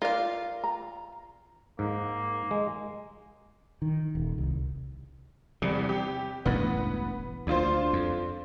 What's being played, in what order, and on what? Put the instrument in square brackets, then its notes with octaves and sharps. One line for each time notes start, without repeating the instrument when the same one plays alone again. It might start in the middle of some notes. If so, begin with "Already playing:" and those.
[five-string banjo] F4 F5 [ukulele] A#4 D5
[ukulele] A#5
[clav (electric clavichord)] G#2 [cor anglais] A#3
[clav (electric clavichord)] G#3
[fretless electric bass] D#3
D#1
C2
[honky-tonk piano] E2 G3 [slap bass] C3
[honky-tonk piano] G4
[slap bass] E1 A1 G2 [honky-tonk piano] B3
[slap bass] D2 [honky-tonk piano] D4 F4 C5
[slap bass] F2